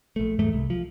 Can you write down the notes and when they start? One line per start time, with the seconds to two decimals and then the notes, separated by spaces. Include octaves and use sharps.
0.16 A#1 A3
0.39 E2 G#2 A3
0.53 C2
0.70 F3